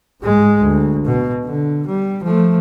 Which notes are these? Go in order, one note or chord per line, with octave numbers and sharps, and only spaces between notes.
G#2 G#3
D2
B2
D3
G3
F3 A3